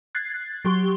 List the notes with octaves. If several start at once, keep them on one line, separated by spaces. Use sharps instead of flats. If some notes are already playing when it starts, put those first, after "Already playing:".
F#6 G#6 A6 C7
F#3 G4 C6 C#6 G7